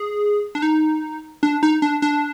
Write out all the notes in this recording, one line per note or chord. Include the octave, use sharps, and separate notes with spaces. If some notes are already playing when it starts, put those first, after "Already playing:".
Already playing: G#4
D4
D#4
D4
D#4
D4
D4